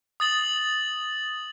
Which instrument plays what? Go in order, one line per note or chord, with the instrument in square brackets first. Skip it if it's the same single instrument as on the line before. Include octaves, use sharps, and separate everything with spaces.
[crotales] D#6 A6 F#7